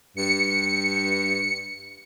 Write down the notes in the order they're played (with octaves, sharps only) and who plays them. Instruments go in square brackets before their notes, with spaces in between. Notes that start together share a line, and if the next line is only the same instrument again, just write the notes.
[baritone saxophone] G2 [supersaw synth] C#7